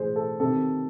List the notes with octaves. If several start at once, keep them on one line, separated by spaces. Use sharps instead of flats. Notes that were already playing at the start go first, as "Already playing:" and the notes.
Already playing: A2 E3 G#4 C5
A4
C3 D#3 A4